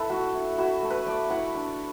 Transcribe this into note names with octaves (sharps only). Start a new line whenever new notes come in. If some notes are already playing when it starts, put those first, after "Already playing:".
Already playing: D4 E4 A4 B4 E5
A3 F#4
E4
E4 F#4
A3
B4
A3 D5
E4 F#5
D4